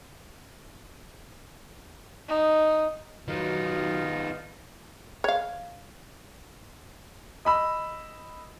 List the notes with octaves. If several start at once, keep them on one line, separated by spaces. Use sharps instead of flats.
D#4
D#3 F#3 B3 D#4 F4
C#5 F5
D#5 B5 E6